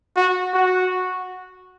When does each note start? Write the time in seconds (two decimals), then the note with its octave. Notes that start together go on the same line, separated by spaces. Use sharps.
0.16 F#4
0.54 F#4